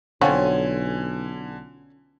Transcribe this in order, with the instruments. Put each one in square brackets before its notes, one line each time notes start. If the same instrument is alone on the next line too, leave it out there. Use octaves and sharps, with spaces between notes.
[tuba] B1 [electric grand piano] D3 G#5 [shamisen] F3 C4 F#4 [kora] C#4 F4